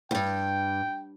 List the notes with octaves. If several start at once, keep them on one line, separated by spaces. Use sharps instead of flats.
E2 G2 G5